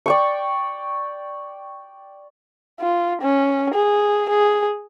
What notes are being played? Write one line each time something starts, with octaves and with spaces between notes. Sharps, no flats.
D5 G5 C#6
F4
C#4
G#4
G#4